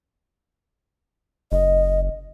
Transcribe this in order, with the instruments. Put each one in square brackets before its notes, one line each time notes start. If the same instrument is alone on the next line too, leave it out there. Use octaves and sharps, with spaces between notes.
[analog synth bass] F#1 [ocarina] D#5